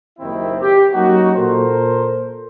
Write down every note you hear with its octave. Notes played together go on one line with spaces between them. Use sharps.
F#1 D#2 D#3 C4 E4 E5
G4
F#3 A#3 C#4 D#4 F#4
A#2 A4 A#4 C5